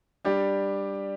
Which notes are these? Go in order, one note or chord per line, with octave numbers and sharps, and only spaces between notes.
G3 D4 G4